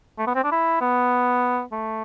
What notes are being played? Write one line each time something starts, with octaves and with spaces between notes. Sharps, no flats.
A3
B3
C4
D4
E4
B3
A3